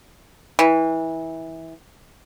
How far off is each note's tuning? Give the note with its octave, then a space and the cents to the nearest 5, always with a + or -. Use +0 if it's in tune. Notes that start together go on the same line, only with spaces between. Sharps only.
E3 -20